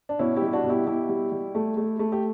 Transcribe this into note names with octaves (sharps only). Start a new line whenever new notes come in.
D4
B2 C#4 E4
E4 G4
G3
G4
D4 F#4
B2
E4 G4
B2 E4 G4
G3
G3
A3
A3
A3
G4